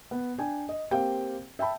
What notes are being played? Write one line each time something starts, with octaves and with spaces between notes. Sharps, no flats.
B3
D4 G5 G#5
D#5
A#3 C4 G4 F5 G5
E5 G5 A5 B5